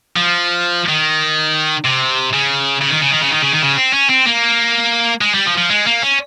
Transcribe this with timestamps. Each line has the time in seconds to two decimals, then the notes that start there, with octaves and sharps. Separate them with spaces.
0.16 F3
0.88 D#3
1.84 C3
2.33 C#3
2.82 C#3
2.91 D#3
3.02 C#3
3.11 D#3
3.22 C#3
3.31 D#3
3.42 C#3
3.53 D#3
3.63 C#3
3.78 C4
3.93 C#4
4.09 C4
4.26 A#3
5.21 G#3
5.34 G3
5.46 F3
5.57 F3
5.70 G#3
5.87 A#3
6.03 C#4